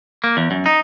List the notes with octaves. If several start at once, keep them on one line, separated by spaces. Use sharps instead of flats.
A#3
E2
F#2
D#4